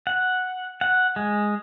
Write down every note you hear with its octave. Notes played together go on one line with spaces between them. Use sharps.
F#5
F#5
G#3